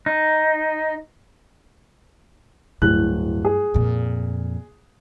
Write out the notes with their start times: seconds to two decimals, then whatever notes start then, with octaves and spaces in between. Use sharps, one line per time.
0.06 D#4
2.82 D1 G2 F#6
3.45 G#4
3.74 F2 A#2